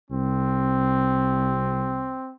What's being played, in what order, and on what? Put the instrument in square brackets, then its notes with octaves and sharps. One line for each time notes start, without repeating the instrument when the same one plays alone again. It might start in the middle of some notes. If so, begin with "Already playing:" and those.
[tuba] C2 [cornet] C4